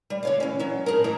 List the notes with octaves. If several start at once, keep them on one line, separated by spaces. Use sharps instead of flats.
G3
D3 C#5 F5
E3 C#4
F#3 C#4
A2 G#4 A#4
G#2 E3 D#4 E4 A#5